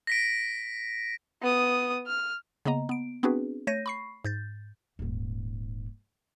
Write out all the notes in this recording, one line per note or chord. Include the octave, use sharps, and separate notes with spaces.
A#6 B6 D7
B3 D#6
F6
C#3 A#3 B3 D#5 A#5
B3 D7
B3 C4 D4 F#4 G#4 B4
A3 C#5 G6 A#6 D#7
B5 C#6 C7
G#2 G6 A6
D#1 G#2